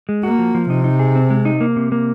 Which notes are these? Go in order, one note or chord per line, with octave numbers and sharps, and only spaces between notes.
G#3
A#3 F#4
F3
F3
C3 D#4
D#4
G#4
C4
G#3
D#4
A#3
C3
A#3